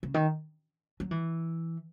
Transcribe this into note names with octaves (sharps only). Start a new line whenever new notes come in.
C#3
D#3
F#3
E3